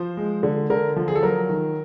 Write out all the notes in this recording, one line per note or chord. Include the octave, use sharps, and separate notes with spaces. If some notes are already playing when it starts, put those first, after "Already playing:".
Already playing: F3 C5
G#3
D3
D3 A#4
F3
G#4
A4
F#3 A#4
D#3